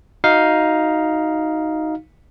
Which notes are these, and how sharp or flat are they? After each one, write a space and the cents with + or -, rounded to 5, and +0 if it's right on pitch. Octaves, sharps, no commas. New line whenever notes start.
D#4 +10 F#4 +0 F5 +0